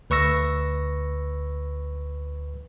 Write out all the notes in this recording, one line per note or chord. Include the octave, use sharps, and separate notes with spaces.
D2 B4 C#6 E6 A#6